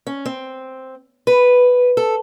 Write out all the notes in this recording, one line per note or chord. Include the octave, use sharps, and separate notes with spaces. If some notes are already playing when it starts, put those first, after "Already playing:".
C#4
C4
B4
A4